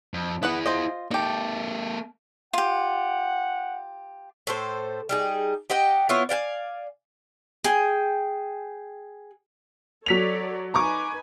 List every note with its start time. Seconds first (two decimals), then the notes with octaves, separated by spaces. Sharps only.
0.14 F2
0.43 B3 E4 G#4 B4 F#5
0.66 F4 C5 D#5
1.11 A#3 D#4 G4 A4
2.53 F4 G4 F#5
4.47 A2 A4 C5
5.09 G3 D#4 G#4
5.70 G4 D#5 F#5 G5
6.09 B3 E4 F4 C#5
6.29 D5 F5 G5 G#5
7.64 G#4 G5
10.06 F#3 A4 C#5 D5 B6 F7
10.74 D#4 B4 G#5 A#5 C#6 D6